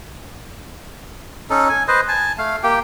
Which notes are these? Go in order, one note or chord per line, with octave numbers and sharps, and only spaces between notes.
C#4 D#4 A4
G#5
B4 C5 D#5
G#5 A5
A3 F5
A#3 G4 G5